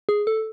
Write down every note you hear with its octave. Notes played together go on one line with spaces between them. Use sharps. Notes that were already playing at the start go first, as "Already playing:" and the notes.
G#4
A4